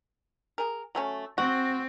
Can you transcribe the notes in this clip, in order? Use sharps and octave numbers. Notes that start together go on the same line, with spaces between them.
G#4 A#4
F#3 A3 C#4
C4 F#4